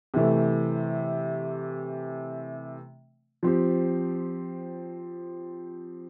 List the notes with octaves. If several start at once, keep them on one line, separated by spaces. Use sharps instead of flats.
C3 E3 A3
F3 C4 G4